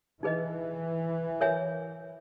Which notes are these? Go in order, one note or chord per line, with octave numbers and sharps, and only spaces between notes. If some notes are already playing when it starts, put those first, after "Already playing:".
E3 D#4 G#4 B4 D#5
A#4 C#5 E5 G#5